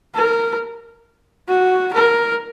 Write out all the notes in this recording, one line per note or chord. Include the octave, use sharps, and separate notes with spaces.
A#4
F#4
A#4